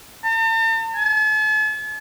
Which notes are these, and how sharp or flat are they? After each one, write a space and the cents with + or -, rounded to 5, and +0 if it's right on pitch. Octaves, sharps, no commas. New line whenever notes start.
A5 +45
A5 -45